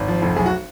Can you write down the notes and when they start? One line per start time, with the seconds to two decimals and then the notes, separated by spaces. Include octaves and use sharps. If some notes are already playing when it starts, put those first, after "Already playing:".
Already playing: G#1
0.08 F3
0.22 F1
0.36 B1 G#4
0.46 F#4